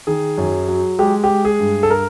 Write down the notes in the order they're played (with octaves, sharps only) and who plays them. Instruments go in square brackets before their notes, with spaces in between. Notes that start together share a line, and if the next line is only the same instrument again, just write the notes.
[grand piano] D#3 G#4
F#2
F#3
G#3 G4
G4
G#3
G#4
G2
A4
A#4